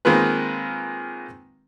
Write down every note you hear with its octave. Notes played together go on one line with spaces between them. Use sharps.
D#3 G#3 A#3 C4 F4 B4